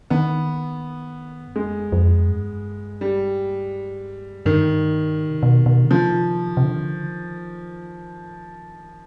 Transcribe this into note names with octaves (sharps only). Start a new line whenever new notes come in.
D#3 B3
G2
F2 G#3
F2
G2
G3
G2 D#3
G#2
C3
B2
B2
D3
C3 F3
C3
D3